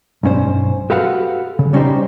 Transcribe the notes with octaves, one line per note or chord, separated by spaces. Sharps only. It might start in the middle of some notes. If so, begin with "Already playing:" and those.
B1 G2 C#4 C5
F#4 G4 A4 B4 F5 F#5
C#3
G3 C#4 D#4 G4 C5